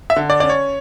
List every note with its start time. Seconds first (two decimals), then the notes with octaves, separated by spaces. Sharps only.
0.10 E5
0.16 D3
0.30 D5
0.40 C#4 D5
0.49 C#5